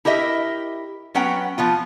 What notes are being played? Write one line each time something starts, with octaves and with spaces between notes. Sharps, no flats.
E4 G4 A#4 D#5 E5
F#3 B3 C#4 F#5 G5 A#5
F3 B3 F4